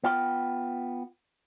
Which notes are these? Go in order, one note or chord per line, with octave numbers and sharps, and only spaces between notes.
B3 F4 G5